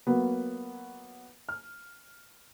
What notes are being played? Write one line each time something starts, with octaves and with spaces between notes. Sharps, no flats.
F#3 A#3 B3
F6